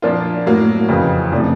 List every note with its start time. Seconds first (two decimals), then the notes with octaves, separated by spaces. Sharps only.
0.02 A#2 F3 A#3 D4 F4
0.46 A2 F#3 A#3
0.89 F2 C#3 E3
1.32 C3 F3 A3 D4